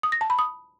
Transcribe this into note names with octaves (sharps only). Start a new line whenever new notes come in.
D#6
A#6
A5
B5
D#6